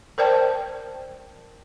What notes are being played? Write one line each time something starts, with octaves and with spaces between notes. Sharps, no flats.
A#4 C5 D5 G5 A5